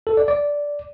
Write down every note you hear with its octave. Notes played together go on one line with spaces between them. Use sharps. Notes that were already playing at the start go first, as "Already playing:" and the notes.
A4
D5
D5